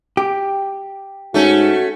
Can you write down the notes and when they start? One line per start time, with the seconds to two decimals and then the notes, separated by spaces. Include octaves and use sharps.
0.17 G4
1.34 G#2 A3 C#4 F#4